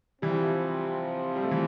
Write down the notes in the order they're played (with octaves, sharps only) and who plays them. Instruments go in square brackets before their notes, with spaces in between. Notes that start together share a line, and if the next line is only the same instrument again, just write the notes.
[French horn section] C3 F3 C4 [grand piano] E3 G3
[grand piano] G3
A3
E3 G3